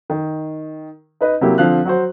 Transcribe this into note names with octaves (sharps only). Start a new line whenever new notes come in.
D#3
D#4 B4 D#5
C3 F#3 A#3 E4 G4
D3 F3 C4 F5 F#6
F#3 F#4 C5